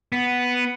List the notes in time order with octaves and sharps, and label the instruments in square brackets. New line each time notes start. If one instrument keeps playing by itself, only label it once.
[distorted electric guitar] B3